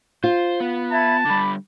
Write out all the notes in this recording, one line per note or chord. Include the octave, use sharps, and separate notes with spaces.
F4 C5
B3
E5 A5 B5 G#6
D3 G3 B5 D6